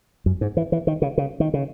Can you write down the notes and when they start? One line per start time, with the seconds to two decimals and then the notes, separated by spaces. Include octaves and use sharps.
0.26 F#2
0.41 G#2
0.57 E3
0.72 E3
0.87 D#3
1.02 C#3
1.18 C#3
1.40 D#3
1.54 C#3